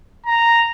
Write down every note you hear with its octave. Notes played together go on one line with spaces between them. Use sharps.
A#5